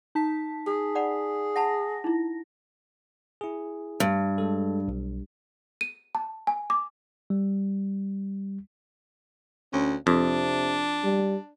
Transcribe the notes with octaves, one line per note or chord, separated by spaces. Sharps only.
D#4 A5 B6
G#4
D5 F#5 B5
F#5 A5 B5 A#6
D#4 E4
E4 G#4
G2
G#3 A4
B1
D#7
A5
G#5
D6
G3
D2 C#4
F2 C3 D4
G3